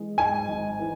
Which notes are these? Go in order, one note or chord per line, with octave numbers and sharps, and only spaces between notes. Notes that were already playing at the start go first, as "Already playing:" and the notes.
Already playing: E3 G#3
G#2 G#5
G#1
E3